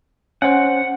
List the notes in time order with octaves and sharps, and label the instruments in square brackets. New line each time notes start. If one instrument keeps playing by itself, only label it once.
[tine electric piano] C#4 C5 [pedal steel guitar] F#5